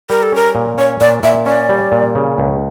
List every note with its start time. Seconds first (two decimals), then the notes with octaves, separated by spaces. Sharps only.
0.10 G3 A#4
0.23 A4
0.32 C#4 A#4
0.55 A#2
0.78 C#4 C#5
1.01 A#2 D5
1.23 A#2 E5
1.46 C#4 D5
1.69 G3
1.92 A#2
2.15 C#3
2.38 C#2